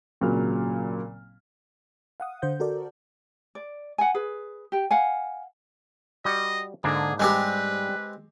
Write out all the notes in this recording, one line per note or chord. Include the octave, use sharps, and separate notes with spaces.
G#1 A#2 C#3 F#3 F6
F5 F#5 D#6
D3 C5 G6
F#4 A4 A#4 D5
D5
F#5 G#5
G#4 B4
G4 G5
F5 F#5 G#5
G3 F#4 D#5
G#2 D3 A#3 D4 G#4
G3 G#3 C4 G4 B4